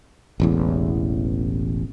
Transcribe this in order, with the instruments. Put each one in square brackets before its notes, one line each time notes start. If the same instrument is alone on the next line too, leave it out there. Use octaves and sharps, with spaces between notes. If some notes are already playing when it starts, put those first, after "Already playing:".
[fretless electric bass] E1 A1 E2